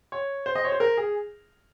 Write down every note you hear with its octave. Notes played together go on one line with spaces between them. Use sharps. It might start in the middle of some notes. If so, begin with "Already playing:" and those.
C#5
C5
D#5
C#5
C5
A#4
G#4